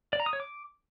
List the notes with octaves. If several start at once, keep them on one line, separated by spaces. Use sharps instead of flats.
D5
A#5
D#6
C#5
D6